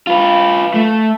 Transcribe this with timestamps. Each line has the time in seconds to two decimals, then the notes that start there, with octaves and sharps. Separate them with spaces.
0.07 F4 B4
0.74 A3